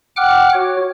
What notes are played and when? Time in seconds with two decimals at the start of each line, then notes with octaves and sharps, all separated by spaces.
0.16 F#5 G5 D6 F6 F#6
0.53 F#4 C#5